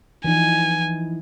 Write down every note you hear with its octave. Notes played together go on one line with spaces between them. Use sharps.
E3 F3 D#4 G#5